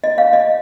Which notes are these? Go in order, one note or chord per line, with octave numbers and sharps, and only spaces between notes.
D#5
F5
D#5